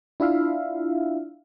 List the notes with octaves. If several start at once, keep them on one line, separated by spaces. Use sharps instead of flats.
D4 E4 F4 E5 F5